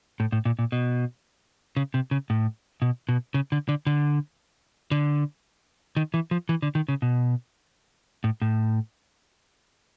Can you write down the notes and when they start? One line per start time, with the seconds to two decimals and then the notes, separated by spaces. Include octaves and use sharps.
0.20 A2
0.32 A2
0.45 A#2
0.59 A#2
0.72 B2
1.77 C#3
1.94 C3
2.11 C#3
2.30 A2
2.82 B2
3.09 B2
3.34 C#3
3.52 D3
3.69 D3
3.87 D3
4.91 D3
5.97 D#3
6.14 E3
6.31 F3
6.49 E3
6.62 D3
6.75 D#3
6.88 C#3
7.02 B2
8.24 A2
8.42 A2